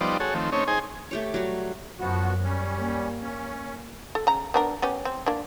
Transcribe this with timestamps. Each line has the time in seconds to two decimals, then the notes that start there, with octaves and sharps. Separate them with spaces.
0.01 F3 G3 B3 D#4 C5 D5
0.20 F#4 G#4 A4 C#5
0.35 D#3 F3 A3 C4
0.52 A3 C4 C#4 D#4 C#5
0.68 D#4 G#4 C5 G#5
1.11 A3 G4 C#5
1.34 F#3 G3 F#4
1.99 F#2 F3 B3 F#4
2.43 G3 C#4
2.79 A#3
3.21 C#4
4.15 A4
4.27 C#3 A#5
4.54 B3 D4 A#4
4.82 B3 C#4 G4
5.05 C4
5.26 A#3 D4